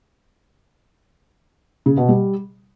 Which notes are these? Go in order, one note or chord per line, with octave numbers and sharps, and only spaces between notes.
C#3
B2
G3